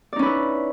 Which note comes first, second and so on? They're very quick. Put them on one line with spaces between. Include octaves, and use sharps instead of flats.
D5 D#4 C#4 B4 E4